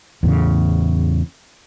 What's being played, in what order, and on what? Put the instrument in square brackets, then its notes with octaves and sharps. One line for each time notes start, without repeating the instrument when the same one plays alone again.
[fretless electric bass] E2 A2 C#3